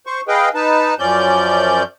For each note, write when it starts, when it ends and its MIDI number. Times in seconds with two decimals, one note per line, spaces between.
0.06 0.21 72
0.06 0.21 85
0.28 0.49 68
0.28 0.49 71
0.28 0.49 75
0.28 0.49 77
0.28 0.49 79
0.55 0.94 63
0.55 0.94 71
0.55 0.94 81
0.99 1.83 42
0.99 1.83 53
0.99 1.83 61
0.99 1.83 74
0.99 1.83 91